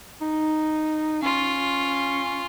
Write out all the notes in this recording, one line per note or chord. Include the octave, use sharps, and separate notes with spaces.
D#4
C#4 F4